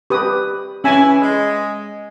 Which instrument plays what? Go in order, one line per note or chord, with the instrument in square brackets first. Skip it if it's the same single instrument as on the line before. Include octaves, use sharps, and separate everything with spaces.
[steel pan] G4 B4 D#6
[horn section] E3 E4 [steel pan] C#4 G#5
[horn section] G#3